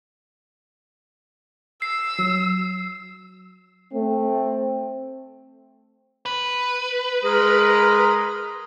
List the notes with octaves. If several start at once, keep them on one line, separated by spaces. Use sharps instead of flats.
E6 C7
F#3
A3 C4
B4
G#3 A#4 D#5